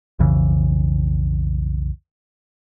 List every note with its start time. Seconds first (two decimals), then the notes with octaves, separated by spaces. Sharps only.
0.19 B1 F2 C#3 E3